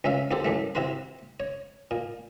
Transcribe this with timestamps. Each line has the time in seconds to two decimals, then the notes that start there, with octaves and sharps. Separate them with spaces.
0.04 C#2 C#4 E5 F5
0.31 D#2 F#4 G4 A4 C5
0.45 F#2 E3 A3
0.75 C3 E4 F#4 B4 C6
1.40 C#5
1.91 A#2